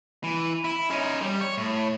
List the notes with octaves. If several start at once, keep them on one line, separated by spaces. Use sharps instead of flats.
E3
E4
C#4 D#4
G3
C#5
A2